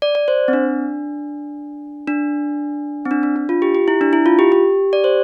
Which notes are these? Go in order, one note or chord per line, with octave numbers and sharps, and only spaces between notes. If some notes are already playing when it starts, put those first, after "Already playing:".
D5
D5
C5
C4
D4
D4
C4
D4
D4
D4
F4
G4
G4
E4
D4
E4
F4
G4
G4
D5
C5